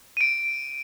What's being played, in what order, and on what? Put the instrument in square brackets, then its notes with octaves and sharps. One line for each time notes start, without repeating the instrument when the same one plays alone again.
[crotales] D7 D#7